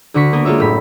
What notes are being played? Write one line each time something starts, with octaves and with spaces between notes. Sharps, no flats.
D2 D3 F#4 C#6 B6
A#3 B3 A#4
G#3 A#3 F4 C#5 E5
F#1 A2 B5